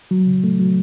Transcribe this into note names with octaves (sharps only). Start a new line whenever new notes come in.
F#3
C#3
A3
F#3